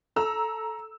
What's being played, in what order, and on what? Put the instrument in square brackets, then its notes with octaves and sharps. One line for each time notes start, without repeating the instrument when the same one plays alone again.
[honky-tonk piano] A4 A#5 E6